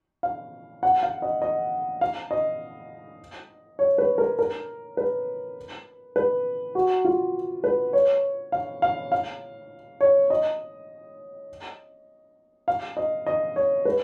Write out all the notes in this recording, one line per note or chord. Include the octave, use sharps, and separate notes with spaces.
F5
F#5
F5
D#5
D#5
F5
D#5
C#5
B4
A#4
A#4
B4
B4
F#4
F4
B4
C#5
F5
F5
F5
C#5
D#5
F5
D#5
D#5
C#5
B4